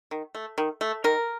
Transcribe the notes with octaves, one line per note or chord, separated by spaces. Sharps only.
D#3
A3
D#3
A3
D#3 A#4